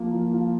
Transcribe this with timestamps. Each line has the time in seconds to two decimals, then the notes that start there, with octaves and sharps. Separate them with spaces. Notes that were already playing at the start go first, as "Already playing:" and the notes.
Already playing: F3 A#3
0.13 F3
0.33 F3